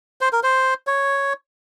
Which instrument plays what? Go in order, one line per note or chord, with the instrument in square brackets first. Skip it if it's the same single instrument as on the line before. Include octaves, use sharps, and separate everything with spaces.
[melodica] C5
A#4
C5
C#5